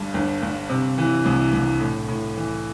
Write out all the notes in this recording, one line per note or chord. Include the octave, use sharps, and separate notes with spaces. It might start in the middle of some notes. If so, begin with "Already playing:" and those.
Already playing: G1 G2
G1
G1
C3
E3
C2
C2
A2
A2
E3